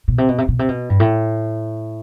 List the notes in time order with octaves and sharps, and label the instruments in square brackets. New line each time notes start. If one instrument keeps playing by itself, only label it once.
[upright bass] B2
C3
B2
C3
B2
C3
B2
G2
A2